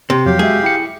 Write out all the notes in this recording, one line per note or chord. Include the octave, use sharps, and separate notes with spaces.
C3
F2 F3 F#3 G4 F5
G#3 F#4 G#4 E5
E4 G5 C#7